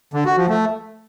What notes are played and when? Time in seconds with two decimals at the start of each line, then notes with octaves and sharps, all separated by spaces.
0.13 D3
0.25 F#4
0.37 F3
0.49 A3